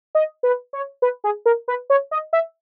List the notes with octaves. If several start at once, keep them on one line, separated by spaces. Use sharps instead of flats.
D#5
B4
C#5
B4
G#4
A#4
B4
C#5
D#5
E5